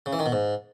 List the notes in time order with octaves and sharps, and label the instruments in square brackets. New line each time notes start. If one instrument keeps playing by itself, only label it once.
[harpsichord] C#3
E3
D#3
B2
G#2